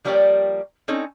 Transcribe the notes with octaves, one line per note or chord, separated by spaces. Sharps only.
F3 G3 A#3 G4 C#5 D5
C4 C#4 D#4 A4 C#5